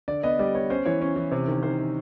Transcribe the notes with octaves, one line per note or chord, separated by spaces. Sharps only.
D3 D5
B3 D#5
G3 D5
B3 C#5
C#4 C5
E3 C#5
C#4
E3
C3
D#3
D#3 C5
D#3